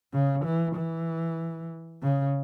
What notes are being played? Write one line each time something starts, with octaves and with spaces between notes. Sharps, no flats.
C#3
E3
E3
C#3